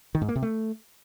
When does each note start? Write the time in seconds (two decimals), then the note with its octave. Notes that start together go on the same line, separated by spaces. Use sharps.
0.15 D#3
0.22 G#2
0.29 A#3
0.36 C3
0.43 A3